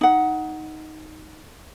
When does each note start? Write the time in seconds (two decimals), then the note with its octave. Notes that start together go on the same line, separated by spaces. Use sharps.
0.01 D#4 F#5